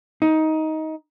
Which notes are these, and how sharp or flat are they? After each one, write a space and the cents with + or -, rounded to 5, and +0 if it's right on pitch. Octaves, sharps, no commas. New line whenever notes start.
D#4 +15